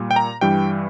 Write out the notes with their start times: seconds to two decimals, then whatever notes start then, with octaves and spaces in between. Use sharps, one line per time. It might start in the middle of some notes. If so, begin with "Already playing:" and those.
Already playing: A#2 G3
0.11 G5
0.16 A#5
0.41 G2 E3 G3 G5